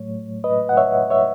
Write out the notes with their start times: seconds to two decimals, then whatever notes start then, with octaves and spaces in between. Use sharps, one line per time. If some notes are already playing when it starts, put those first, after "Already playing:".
Already playing: A2 F#3 A3 C#5
0.44 B4 D#5
0.69 F#5
0.77 C#5 E5
1.10 C#5 E5